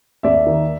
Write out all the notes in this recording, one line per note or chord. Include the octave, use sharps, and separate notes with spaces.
D#2 D5 E5
D#3